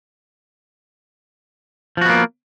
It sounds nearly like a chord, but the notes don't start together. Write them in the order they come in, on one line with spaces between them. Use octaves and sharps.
F3 F#4 B3 A#3